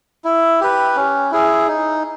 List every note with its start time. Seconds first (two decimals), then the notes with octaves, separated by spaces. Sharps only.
0.24 E4
0.61 G4 B4
0.96 C#4
1.31 E4 G#4
1.67 D#4